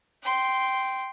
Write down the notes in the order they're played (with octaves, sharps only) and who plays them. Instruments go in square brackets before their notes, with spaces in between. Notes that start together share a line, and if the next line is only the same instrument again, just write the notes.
[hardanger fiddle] G5 C6